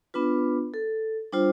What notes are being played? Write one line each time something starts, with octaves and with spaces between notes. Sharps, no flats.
B3 D4 F4 B4
A4
G3 D4 F4 C5